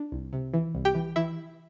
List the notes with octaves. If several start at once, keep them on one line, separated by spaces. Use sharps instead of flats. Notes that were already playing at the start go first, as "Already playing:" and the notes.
Already playing: D4
C2
C3
E3
C2
G4 G5
E3
E3 E4 E5